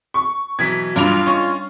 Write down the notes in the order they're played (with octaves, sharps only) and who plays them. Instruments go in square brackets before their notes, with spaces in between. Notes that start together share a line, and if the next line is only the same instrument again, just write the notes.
[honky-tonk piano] C#6
[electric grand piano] B2 E3 F#3 [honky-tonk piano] G#6 B6
[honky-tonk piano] G2 F7 [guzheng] G3 D4 [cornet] F4
[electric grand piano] C#4 [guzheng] D#5 [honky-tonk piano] C#6